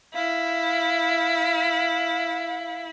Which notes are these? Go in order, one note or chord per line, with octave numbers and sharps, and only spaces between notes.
E4 F5